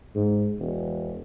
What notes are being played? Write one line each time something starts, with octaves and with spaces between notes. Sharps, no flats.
G#2
E1